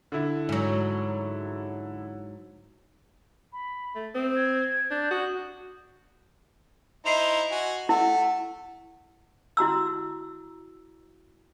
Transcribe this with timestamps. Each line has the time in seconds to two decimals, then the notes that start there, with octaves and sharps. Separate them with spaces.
0.12 D3 E4
0.49 G#2 F#3
3.53 B5
3.95 A3
4.15 C4 D#6
4.36 G#6
4.91 D4 G6
5.11 F#4 D#6
7.06 D#4 E4 C5 D#5 C7 F7
7.51 F#4 G#5
7.89 A3 E4 F#5 A5 E6
9.57 E4 F#4 A#5 E6